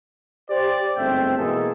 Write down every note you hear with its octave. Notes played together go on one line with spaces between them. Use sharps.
G4 C5 D5
G1 G#2 A3 C4 E5 G5
B2 E3 G#3 A#3 G#4 A4